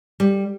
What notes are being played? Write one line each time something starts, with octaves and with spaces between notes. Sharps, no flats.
G3